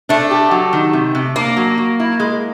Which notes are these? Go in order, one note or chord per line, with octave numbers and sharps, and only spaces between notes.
A3 D4
G4
F#3
D#3
C3
C3
A#3 D4
F#3
F#3
E4
G#3